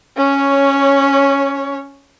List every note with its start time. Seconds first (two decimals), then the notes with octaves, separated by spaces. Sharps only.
0.17 C#4 C#5